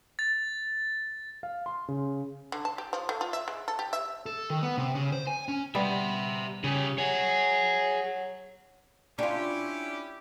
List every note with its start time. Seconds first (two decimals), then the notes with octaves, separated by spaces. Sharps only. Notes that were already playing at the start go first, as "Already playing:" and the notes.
0.19 A6
1.43 F5
1.66 C6
1.88 C#3
2.52 D3
2.65 A5
2.78 G4
2.93 F3
3.09 A3
3.21 F4
3.33 E5
3.48 G#3
3.68 A4
3.79 G4
3.93 E5
4.26 A4
4.50 D#3
4.62 B3
4.78 C3
4.95 C#3
5.12 C5
5.27 G#5
5.48 C#4
5.75 G3 B3 G4 E5
6.64 C#3 G4 G#4
6.98 G#4 C#5 F#5
9.19 C#4 D4 E4 F4 G4